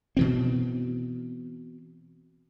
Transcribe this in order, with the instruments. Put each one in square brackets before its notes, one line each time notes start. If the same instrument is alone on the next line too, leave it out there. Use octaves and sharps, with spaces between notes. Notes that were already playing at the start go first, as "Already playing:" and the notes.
[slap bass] B2 E3 C4